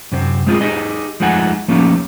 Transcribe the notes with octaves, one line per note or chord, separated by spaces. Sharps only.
F#2 C3 C4
G#3 C4 F4 G#4
D#4 G4 G#4 D#5
F3 G#3 A3 D#4 F#5 G#5
F3 A3 A#3 C#4 D#4 G4